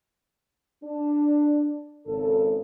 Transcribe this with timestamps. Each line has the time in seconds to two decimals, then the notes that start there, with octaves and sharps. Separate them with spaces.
0.83 D4
2.07 G#1 C#3 A4